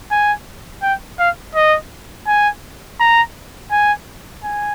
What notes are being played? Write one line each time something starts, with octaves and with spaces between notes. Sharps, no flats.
G#5
G5
F5
D#5
G#5
A#5
G#5
G#5